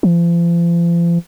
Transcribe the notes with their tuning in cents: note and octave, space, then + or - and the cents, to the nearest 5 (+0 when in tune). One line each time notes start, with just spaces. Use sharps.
F3 -40